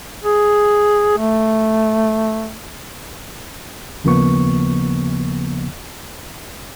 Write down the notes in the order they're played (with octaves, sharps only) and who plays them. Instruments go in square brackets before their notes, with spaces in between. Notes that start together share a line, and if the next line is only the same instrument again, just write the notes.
[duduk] G#4
A3
[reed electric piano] D#2 C#3 F3 A#3 B3 C#6